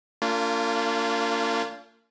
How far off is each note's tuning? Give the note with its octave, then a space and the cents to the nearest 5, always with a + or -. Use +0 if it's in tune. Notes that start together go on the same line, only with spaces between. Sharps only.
A#3 -40 D4 -40 F4 -10